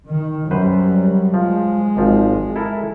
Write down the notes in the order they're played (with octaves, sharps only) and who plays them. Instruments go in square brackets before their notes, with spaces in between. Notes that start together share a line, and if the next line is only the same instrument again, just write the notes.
[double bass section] D#3
[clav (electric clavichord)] F#2 B4 C5 [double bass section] F#3 G3
[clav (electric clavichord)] F3 [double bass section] G#3
[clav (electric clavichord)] G#1 F3
E4 A4 A#4